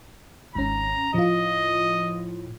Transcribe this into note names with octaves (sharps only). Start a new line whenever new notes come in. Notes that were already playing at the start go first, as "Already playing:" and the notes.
G#1 G#2 C#4 A#5
A2 F3 F4 D#5